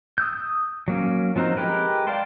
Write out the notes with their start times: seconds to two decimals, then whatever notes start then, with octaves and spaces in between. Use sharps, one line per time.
0.18 D#6 E6 G6
0.88 F#3 A#3 C#4
1.36 F3 F#3 C4 D#4 A#4
1.57 G#3 G4 A#4 B4
2.07 D5 F5 G5 A5 C6